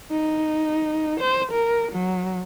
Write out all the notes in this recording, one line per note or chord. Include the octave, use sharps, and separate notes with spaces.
D#4
C5
A#4
F#3